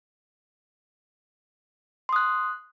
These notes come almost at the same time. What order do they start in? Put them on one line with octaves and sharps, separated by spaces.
C6 D#6 F#6